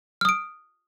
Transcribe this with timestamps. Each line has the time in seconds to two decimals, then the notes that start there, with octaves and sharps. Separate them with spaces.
0.21 F6
0.25 D#6
0.29 D7